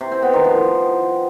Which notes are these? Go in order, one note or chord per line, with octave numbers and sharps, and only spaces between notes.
C3
C4
B3
D#3
F3